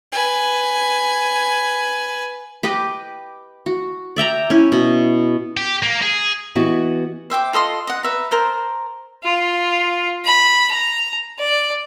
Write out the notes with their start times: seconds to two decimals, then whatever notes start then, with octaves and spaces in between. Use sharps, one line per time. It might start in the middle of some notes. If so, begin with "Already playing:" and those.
0.12 B4 G#5
2.63 G4 B4 D#5 G5
3.66 F#4
4.16 D5 E5 G5 A#5
4.50 C#4 E4
4.72 B2
5.57 G4
5.83 A#3
6.02 G#4
6.55 E3 B3 E4 F#4 G4 D#5
7.30 C5 E5 G5 D6
7.53 F4 A4 D#5 C6
7.87 D#5 F#5
8.03 B4 E5 A#5
8.31 A#4 C5 A5
9.23 F4
10.25 B5
10.71 A#5
11.39 D5